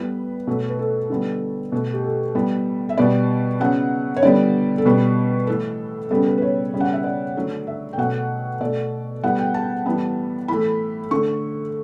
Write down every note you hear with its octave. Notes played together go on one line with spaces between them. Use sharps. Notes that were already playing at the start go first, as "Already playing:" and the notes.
Already playing: A2 G3 B3 B4
B2 F#3 A3
B4
A4
D3 G3 B3
B2 A3
G4
A4
A2 G3 B3
E5
B2 G3 B3 D5
C#3 F#3 B3 F#5
C#5
D3 G3 B3 D5
A4
B2 G3 B3 B4
A2 E3 A3 A4
C#3 G3 B3 A4
B4
B4
C#5
C#3 G3 B3
F#5
E5
D5
D3 F#3 A3
E5
G5
B2 F#3 A3 F#5
B2 A3 D5
A2 G3 B3 F#5
G5
A5
A2 E3 G3 B3
A2 E3 A3 B5
D3 A3 C#6